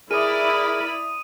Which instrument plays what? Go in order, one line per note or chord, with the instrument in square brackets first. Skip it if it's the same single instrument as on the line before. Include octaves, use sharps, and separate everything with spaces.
[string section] E4 D5 B5 [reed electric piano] G#4 [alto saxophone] A#4 [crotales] D#6 D#7